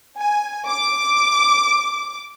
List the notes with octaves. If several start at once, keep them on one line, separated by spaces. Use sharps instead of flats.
G#5
D6